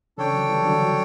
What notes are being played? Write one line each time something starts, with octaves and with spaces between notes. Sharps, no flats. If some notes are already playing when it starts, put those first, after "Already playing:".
C#3 E3 D4 A4 C#5 G5
D3 F#3
E3 G3
D3 F#3
D3 F#3